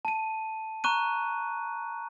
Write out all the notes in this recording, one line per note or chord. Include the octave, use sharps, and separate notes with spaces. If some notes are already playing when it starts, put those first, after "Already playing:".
A5 D#7
A#5 C#6 F#6 D#7